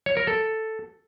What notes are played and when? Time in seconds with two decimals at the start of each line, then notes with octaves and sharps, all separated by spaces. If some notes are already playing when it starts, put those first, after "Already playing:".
0.06 C#5
0.17 A#4
0.27 A4